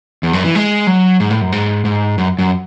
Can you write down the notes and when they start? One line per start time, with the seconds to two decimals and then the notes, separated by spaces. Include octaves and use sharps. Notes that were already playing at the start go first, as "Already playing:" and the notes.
0.23 E2
0.33 F#2
0.44 E3
0.55 G#3
0.87 F#3
1.20 G#2
1.30 A2
1.42 F#2
1.52 G#2
1.85 G#2
2.18 F#2
2.39 F#2